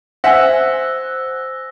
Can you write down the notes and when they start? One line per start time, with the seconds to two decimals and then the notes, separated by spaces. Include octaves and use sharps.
0.24 C5 E5 F#5 G#5 E6 F#6 A#6